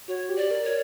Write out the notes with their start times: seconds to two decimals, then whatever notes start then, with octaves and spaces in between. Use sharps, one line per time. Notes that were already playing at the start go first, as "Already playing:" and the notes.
0.08 F#4 C#5
0.29 G4
0.36 D5
0.42 G4
0.51 A#4
0.65 C#5